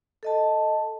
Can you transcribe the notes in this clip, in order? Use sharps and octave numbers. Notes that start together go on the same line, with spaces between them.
A4 D#5 A5